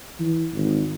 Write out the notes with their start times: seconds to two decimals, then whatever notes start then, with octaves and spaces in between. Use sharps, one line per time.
0.19 E3
0.54 G#1